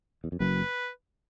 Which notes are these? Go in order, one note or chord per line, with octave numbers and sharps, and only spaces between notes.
E2
F2
F#1 F#2 B4